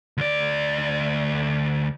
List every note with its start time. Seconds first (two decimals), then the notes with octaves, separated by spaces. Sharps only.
0.17 D2 D5